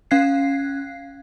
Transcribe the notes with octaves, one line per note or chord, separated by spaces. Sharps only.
C#4 F5 F#6 G#6 C7